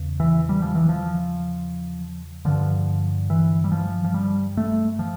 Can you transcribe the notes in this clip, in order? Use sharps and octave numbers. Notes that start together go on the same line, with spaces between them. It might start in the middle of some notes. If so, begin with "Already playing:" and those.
Already playing: E2 C#3
E3
G3
F3
E3
F3
G2 D3 F3
E3
G3
F3
F3
G3
A3
F3